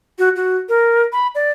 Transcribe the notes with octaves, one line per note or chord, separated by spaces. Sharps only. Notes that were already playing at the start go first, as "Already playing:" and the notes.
F#4
F#4
A#4
B5
D5